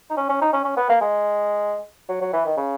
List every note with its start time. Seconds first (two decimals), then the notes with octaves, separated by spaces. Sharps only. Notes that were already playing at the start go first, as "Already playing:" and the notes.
0.10 D#4
0.17 C#4
0.29 C#4
0.41 D#4
0.53 C#4
0.64 C#4
0.77 B3
0.89 A#3
1.01 G#3
2.09 F#3
2.21 F#3
2.33 E3
2.45 D#3
2.57 C#3